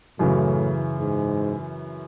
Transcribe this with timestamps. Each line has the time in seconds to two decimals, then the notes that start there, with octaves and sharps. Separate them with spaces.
0.19 F#2 A2 C#3 E3
0.99 G#2